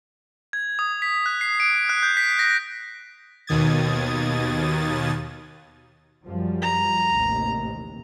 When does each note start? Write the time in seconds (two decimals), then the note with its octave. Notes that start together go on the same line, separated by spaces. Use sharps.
0.53 G#6
0.79 D#6
1.02 B6
1.26 F#6
1.41 C7
1.60 D7
1.89 F#6
2.03 G6
2.17 B6
2.39 A#6
3.47 D#2 B2 D#3 D#6 G#6 A6
6.26 F#2 F3 G3
6.62 A#5
7.10 A1 D#2 C3